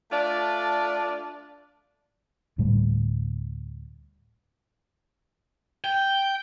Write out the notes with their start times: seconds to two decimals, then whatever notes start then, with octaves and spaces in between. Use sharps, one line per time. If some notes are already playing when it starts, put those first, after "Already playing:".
0.11 A3 D4 F4 D5
2.58 D2 A2 G3 A3
5.84 G5